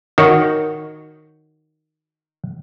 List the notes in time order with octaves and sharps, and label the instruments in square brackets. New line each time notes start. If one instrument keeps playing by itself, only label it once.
[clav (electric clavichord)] D#3 F#4 C#5